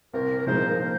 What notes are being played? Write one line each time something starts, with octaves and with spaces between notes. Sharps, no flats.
C2 A#4
A#4
A#2 F3 G#3 D#4 C5
A#4
C5